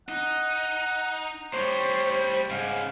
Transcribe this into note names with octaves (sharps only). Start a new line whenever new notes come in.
D#4 F#5
A2 G3 C5 C#5
G#2 C#3 F5